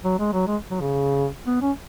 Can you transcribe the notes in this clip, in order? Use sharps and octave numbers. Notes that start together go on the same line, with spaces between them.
F#3
G#3
F#3
G#3
F#3
C#3
B3
C#4